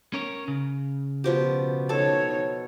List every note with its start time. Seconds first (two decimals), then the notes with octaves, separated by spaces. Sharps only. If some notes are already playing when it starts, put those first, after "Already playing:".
0.14 C#4 A#4 C#5
0.48 C#3
1.24 B2 F3 G4
1.89 D#4 A4 C#5 A5